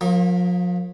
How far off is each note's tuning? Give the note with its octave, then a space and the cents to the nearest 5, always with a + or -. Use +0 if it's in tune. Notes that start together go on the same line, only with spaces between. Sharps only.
F3 +40 A#3 +5 C#6 -45